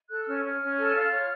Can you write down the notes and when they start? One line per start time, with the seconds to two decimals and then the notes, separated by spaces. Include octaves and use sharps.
0.10 A4 F#6
0.22 E6
0.27 C#4 F6
0.44 C#4 F6
0.61 C#4
0.78 A4
0.95 F4
1.12 C#5